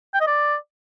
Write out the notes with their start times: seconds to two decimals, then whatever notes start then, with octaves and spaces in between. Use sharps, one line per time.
0.14 G5
0.20 D#5
0.27 D5